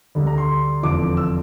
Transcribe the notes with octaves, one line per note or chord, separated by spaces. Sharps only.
D2 D3 G3
A#5
C6
F1 E2 D3 F3 D6
E6